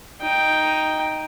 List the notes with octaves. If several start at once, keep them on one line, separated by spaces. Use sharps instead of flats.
D#4 G5